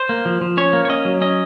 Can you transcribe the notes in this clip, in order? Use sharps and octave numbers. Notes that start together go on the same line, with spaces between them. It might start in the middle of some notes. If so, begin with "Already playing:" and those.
Already playing: C5
A#3
F3
F3
C#4 C#5
A#3
C#5
C#4 D#5
F#3
C#4 D#5